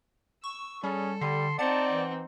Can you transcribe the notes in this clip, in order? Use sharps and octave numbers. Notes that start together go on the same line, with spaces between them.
C#6 E6
G3 C#4 G#4 A4
D3 G3 C6
C4 D#4 D5 F#5 A5
E3